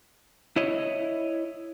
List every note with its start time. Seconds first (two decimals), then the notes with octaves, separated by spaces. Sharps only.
0.56 E4 C#5 D#5